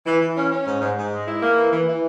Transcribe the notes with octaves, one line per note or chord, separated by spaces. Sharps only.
E3
E3
C#4
C#4
G#2
G#2
G#2
G#3
E4
A#3
E3
E3
E3